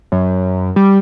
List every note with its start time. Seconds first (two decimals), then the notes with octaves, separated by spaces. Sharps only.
0.12 F#2
0.76 G3